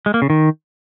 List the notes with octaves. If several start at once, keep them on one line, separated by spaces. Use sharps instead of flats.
G#3
A#3
C#3
D#3